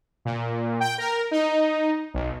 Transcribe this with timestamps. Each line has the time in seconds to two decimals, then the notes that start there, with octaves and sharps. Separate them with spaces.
0.25 A#2
0.80 G5
0.98 A#4
1.31 D#4
2.14 B1